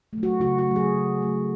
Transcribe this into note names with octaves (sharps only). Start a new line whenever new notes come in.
A3
F#3
F#4
C#3 F#4
F#4
F#3 A3
G#4
C#3
F#3 A3